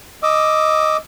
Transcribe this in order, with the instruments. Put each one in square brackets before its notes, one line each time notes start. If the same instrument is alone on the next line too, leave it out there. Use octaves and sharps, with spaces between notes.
[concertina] D#5 D6 E6